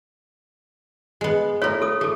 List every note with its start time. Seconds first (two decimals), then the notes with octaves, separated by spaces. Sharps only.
1.21 G#3 B3
1.62 E4 A4 A#4 C#5
1.82 A4 D#6
2.01 A3 G#4 A4